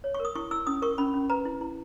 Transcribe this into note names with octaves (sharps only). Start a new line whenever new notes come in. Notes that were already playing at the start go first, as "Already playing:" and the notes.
C#5
C#6
A#4
D#6
E4 C#6
E4 E6
C#4 D#6
A#4 C#6
C#4 B5
C#4
B4 A#5
E4
E4